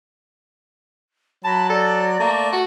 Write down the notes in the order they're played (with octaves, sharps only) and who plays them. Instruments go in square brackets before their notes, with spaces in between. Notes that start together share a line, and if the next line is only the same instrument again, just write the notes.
[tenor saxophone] F#3 [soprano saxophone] A5 [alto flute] B5
[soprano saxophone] A4 [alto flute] D5
[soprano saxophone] A3 [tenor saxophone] A#3
[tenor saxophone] F#4 [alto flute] F#5